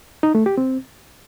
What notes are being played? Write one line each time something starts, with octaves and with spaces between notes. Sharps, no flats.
D#4
A3
G4
C4